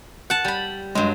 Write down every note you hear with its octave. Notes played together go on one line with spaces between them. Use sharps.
F#5 A5
G3 B5
G2 F#3 G#3